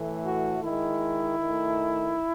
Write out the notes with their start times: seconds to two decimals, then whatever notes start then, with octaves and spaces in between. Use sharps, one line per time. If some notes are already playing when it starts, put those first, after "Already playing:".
Already playing: A2 E3 A3
0.25 F#4
0.63 D#3 G#3 E4
1.39 D#3
1.44 A3